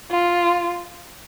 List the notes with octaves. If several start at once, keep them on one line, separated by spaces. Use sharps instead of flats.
F4